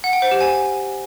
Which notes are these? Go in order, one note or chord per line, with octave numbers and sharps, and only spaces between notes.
F#5
G5
C5
G4
G#5